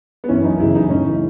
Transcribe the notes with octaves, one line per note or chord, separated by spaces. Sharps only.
B3
F#2 E3 C#4
D#4
F#2 C#3 E3 E4
D#4
A2 E3 C#4